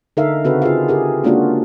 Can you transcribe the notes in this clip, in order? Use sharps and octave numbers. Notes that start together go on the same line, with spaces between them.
D3 D#4 A4 A#4 E5 F5
C#3 C4 F#4 A4 B4
F4 G#4 F5
G4 G#4 A#4
G#3 A#3 C#4 D4 F4 F#4